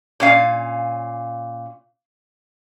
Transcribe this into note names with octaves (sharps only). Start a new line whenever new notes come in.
A#2 C#4 F5